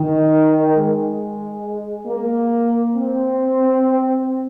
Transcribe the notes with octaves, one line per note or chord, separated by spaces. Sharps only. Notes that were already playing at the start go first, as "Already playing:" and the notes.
Already playing: D#3
G#3
A#3
C4